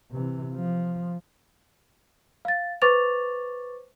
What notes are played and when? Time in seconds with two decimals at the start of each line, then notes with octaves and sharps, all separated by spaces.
0.11 C3 E3
0.54 F3
2.45 F5 A6
2.82 B4 C5 C#6 D6 A6 F7